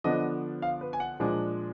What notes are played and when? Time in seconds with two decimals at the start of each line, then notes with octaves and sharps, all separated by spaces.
0.04 D3 F3 B3 D4 D#5
0.62 F5
0.81 B4
0.93 G#5
1.00 F#5
1.20 A#2 F3 G#3 D4